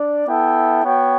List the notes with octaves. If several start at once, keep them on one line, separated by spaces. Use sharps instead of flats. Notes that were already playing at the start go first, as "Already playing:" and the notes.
Already playing: D4 D5
B3 E4 A4 E5 G5
B3 F#4 C#5 G5